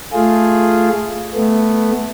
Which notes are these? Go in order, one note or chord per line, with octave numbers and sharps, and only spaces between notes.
A3 F4 G#4
A3 B3